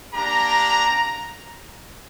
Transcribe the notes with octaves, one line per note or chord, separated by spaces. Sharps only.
A#3 D4 G4 A#5